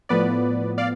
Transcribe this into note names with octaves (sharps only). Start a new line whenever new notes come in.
A2 F3 B3 B4 D5
D5 F5